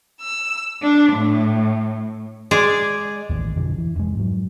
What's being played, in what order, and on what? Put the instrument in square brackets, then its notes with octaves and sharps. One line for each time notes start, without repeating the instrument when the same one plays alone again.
[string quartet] E6
D4
A2
[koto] G#3 G#4 D5
[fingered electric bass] A1 D#2
F2 B2 D3 F3
E3
F1 F2 A2 G#3
G#2 F#3